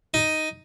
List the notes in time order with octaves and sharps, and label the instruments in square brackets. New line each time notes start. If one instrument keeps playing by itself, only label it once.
[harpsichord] D#4